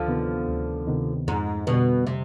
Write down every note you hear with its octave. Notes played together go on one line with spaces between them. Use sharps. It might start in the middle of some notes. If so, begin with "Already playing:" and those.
Already playing: D2 D3 F3
C3 D#3 B3
D2
C3 D#3 B3
F2 G#2
B2 D3 G3
C3